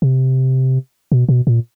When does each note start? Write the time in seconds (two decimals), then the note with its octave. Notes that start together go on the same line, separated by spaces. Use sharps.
0.02 C3
1.12 B2
1.29 B2
1.47 A#2